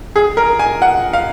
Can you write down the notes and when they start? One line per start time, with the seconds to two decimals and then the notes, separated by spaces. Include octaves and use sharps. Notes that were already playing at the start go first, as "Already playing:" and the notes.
0.16 G#4
0.37 A#4
0.59 G#5
0.82 F#5
1.13 F5